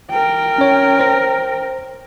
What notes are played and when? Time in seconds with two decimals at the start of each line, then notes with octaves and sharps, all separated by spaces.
0.11 A#4 G5
0.58 C#4 C#5
0.99 C5 A#6